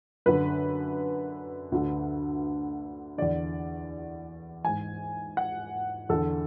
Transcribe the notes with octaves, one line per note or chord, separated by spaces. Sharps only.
F#2 D3 B4
D2 D3
E2 D3 D5
G#2 E3 G#5
F#5
E2 D3 A4